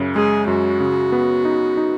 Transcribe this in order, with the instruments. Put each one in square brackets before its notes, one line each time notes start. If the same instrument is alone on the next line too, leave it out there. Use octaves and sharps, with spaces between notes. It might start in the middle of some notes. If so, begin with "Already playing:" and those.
Already playing: [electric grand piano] F#2 C#3
[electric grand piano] G#3 [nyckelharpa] G#4
[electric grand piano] F#2 [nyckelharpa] F#4
[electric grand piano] C#3
B3
D#4
D#4